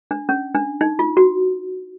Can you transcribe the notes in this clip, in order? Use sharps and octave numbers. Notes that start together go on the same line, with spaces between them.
D4
C#4
D4
D#4
F4
F#4